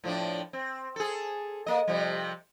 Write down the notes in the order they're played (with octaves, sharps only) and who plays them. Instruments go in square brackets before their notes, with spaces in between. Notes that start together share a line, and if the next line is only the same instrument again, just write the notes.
[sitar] A2 F3 D4
C4
G#4 A4
A#3 D#5
C3 F3 G3